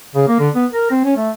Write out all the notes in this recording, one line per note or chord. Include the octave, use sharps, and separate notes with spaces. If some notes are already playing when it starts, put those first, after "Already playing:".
C#3
A#3
D3
B3
A#4
C4
C#4
A3